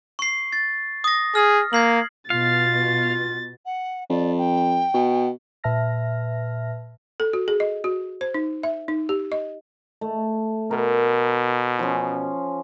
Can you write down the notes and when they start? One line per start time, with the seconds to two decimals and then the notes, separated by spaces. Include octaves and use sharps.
0.19 C#6 C7
0.52 A6
1.04 D#6 A#6
1.35 G#4 F6
1.73 A#3 G#6 C7 F#7
2.30 B2 F4 F5 A6
3.66 F#5
4.10 F2 D5
4.38 G5
4.94 B2
5.64 A#2 B4 E5 A5 F6 A#6
7.20 A4
7.33 F#4
7.48 G#4
7.60 D#5
7.84 F#4
8.21 C5
8.34 D#4
8.63 E5
8.88 D#4
9.09 G4
9.32 D#5
10.01 A3
10.71 B2 A#4
11.79 F3 C#4